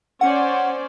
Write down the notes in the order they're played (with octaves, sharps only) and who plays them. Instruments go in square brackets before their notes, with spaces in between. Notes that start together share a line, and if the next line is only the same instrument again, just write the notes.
[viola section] C#4 C5 D5 [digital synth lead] F#5